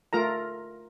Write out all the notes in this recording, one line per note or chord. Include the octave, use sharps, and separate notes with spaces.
A3 F4 A#4 A#5